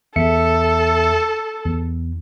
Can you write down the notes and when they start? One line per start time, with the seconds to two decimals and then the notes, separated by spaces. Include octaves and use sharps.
0.16 E2 A4 E5 C#7
1.65 E2